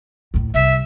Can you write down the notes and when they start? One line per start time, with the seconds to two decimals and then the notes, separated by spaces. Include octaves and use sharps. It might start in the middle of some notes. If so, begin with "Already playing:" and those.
0.34 D#2 A2
0.54 C2 E5